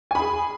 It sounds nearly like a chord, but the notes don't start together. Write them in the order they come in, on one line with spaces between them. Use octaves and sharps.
G#5 B5 G#4